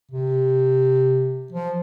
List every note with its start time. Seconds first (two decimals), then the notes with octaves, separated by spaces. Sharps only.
0.11 C3
1.52 F3